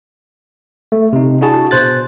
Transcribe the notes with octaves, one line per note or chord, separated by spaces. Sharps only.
A3
C3 D#4
D4 E4 F#4 G#4 A5
B2 C5 F#6 A6